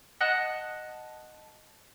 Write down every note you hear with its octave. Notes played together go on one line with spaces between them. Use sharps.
D#5 F#5 A5 F#6